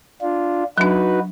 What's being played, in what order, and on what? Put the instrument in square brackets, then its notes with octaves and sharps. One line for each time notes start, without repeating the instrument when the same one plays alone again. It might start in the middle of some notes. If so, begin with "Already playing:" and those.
[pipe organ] D4 F4
[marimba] F#3 D4 [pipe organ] D#4 F#4 B4